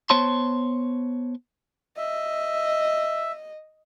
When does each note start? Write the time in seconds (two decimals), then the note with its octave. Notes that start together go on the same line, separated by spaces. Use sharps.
0.10 B3 C5 C#5 A5 C6
1.97 D#5 E5